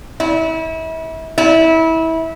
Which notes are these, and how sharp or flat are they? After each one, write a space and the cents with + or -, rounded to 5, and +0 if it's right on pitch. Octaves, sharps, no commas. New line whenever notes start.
E4 -35
E4 -25